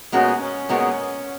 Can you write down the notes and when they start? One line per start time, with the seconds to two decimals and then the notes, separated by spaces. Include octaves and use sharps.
0.12 A#2 G#3 B3 C#4 F#4 A#4
0.41 C#4
0.69 A#2 G#3 B3 F#4 A#4